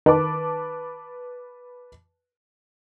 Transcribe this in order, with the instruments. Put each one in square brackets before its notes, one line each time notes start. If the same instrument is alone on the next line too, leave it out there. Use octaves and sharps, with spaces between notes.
[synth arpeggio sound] D#3 [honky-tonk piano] B4 A5 D6